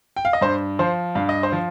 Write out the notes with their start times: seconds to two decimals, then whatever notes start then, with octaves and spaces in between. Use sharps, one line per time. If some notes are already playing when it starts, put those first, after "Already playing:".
0.16 G5
0.25 F5
0.33 D#5
0.41 G2 C5
0.79 F3 C5
1.15 G2 F5
1.29 D#5
1.43 C5
1.52 F3